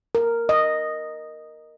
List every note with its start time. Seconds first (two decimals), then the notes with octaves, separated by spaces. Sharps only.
0.15 A#4
0.49 D#5